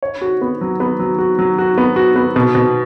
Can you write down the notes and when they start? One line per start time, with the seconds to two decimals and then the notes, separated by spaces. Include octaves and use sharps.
0.03 C#5
0.21 F#4
0.41 B3
0.61 F#3
0.80 B3
0.99 F#3
1.18 F#4
1.39 F#3
1.58 F#4
1.78 B3
1.96 F#4
2.16 B3
2.36 B2
2.55 B2